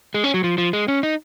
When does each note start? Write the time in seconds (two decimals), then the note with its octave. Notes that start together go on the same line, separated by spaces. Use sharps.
0.14 G#3
0.24 C#4
0.34 F#3
0.44 F3
0.58 F3
0.73 G#3
0.88 C#4
1.03 D#4